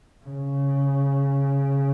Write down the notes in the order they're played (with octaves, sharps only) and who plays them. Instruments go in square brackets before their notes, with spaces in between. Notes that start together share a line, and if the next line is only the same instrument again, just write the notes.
[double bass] C#3